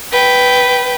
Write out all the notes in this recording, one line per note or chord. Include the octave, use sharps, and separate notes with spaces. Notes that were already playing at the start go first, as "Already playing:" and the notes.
B4 G5